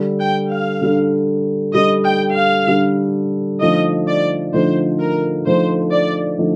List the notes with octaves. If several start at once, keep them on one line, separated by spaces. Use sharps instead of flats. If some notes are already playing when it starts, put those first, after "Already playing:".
Already playing: D3 G3 D4 A4
G5
F5
D3 G3 D4 A4
D3 G3 D4 A4 D#5
G5
F5
D3 G3 D4 A4
D3 F3 A3 D#4 D#5
D5
D3 F3 A3 D#4 C5
A#4
D3 F3 A3 D#4 C5
D5
D3 F3 A3 D#4